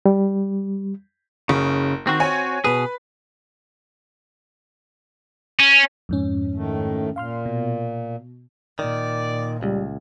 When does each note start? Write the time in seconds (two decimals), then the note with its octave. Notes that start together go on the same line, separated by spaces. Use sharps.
0.06 G3
1.49 F#1 C#3
2.07 D#3 C4 F#4
2.20 C#5 G#5
2.64 B2 G#4 B4
5.60 C#4
6.09 F2 G#2 C#4
6.55 A2 D#3 A3
7.16 A#2 F5 C6 F6
7.46 B2
8.79 A#2 D#3 D5
9.63 C#2 G3